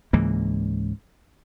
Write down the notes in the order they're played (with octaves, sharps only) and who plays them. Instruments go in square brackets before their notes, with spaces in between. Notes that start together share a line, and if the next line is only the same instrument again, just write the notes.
[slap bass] C#2 G#2 E3 A#3